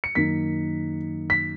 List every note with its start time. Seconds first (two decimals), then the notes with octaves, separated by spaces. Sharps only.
0.04 C#7
0.15 F#2 D#3 A#3 D#4 B6
1.30 B6